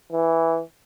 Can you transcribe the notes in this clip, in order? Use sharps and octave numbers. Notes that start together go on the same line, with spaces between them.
E3